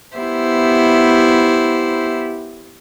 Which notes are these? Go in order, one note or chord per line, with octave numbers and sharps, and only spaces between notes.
B3 E4 G4 C5 E5